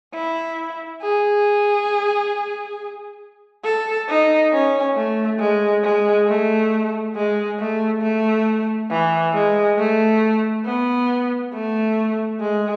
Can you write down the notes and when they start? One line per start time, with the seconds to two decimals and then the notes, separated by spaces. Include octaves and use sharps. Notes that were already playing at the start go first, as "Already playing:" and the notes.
0.13 E4
1.02 G#4
3.64 A4
4.08 D#4
4.52 C#4
4.96 A3
5.39 G#3
5.83 G#3
6.28 A3
7.15 G#3
7.59 A3
8.02 A3
8.90 E3
9.33 G#3
9.77 A3
10.66 B3
11.53 A3
12.40 G#3